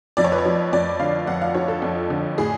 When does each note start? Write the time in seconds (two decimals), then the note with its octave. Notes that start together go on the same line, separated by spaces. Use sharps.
0.17 F2 D5
0.24 C#5
0.32 B4
0.38 C#5
0.45 F3
0.73 F2 D5
1.00 D3 F5
1.27 F2 F#5
1.42 F5
1.54 F3 C#5
1.68 A4
1.82 F2
2.10 D3
2.38 A2 G#4